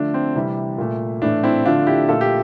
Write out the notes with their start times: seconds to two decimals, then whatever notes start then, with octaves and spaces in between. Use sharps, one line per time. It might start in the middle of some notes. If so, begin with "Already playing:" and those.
Already playing: D3 F3 A3 D4
0.14 C4
0.35 C3 E3 G3
0.78 A#2 A3
1.22 A2 E3 A3 D4
1.43 C4 E4
1.65 D3 F3 A3 D4 F4
1.87 E4 G4
2.09 A#2 F3 A3 F4 A4
2.21 G4